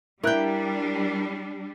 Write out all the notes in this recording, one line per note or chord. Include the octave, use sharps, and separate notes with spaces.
G3 D4 E4 A#4 G5 F#6